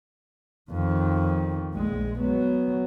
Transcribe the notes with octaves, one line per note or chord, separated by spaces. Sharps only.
F2 D#3
A#1 G#3
F#3 B3